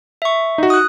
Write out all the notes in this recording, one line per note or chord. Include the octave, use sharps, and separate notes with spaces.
E5 C#6
D#4 F#4
D#6 F#6